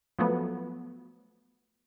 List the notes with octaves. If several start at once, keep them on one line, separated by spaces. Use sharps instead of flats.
F3 F#3 A3 B3